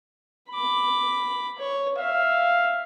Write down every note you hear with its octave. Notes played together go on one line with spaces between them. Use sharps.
B5 D6
C#5
E5 F5